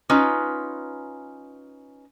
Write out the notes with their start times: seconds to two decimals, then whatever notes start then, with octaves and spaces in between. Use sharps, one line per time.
0.10 C#4 D#4 F4 B4